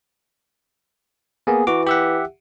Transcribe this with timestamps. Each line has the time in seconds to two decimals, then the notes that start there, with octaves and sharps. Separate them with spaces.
1.47 A#3 B3 G#4
1.67 E3 F#4 D6
1.87 G4 E5 F#5